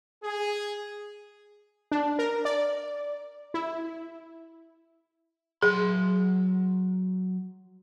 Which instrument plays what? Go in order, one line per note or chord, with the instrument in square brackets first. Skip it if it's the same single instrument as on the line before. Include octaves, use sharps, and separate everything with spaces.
[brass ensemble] G#4
[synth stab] D4
A#4
D5
E4
[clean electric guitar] F#3 C6 [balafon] G#4